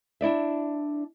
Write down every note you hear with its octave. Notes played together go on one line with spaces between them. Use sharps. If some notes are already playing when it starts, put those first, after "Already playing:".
D4 E4 D5 E5